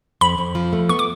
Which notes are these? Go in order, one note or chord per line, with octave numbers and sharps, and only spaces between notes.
F2 B5
F2
F3
A3
B3 C#6
D6